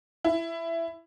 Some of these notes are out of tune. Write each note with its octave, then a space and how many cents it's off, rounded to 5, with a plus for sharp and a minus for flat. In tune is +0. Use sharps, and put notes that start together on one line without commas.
E4 +15